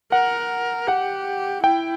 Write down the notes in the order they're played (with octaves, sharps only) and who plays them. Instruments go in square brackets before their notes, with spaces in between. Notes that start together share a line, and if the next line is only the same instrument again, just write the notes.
[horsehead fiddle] A#4 [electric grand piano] F#5
[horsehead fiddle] G4 [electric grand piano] F#5
[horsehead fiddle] E4 [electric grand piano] G5